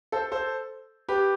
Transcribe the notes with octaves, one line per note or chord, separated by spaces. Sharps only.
A4 C5
A4 C5
G4 B4